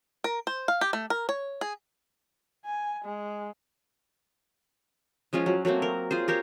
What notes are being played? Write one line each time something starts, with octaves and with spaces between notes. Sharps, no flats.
A#4
C5
F5
G4
A3
A#4
C#5
G#4
G#5
G#3
F3 G#3 C#4 F4
F#3
F#3 A3 A#3 C4
A#4
F4 G#4 C5
G4 A#4 C5 C#5